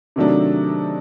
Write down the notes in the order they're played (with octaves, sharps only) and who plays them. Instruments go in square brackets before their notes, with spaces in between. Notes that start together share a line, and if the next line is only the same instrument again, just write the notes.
[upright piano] C3 D#3 F#3 A3 D4